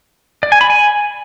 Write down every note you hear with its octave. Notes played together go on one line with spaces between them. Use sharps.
D5
G#5
B5
G#5